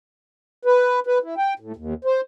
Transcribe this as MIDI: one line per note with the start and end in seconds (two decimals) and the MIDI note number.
0.65 1.00 71
1.07 1.18 71
1.23 1.35 64
1.37 1.54 79
1.59 1.72 45
1.76 1.94 39
2.05 2.21 72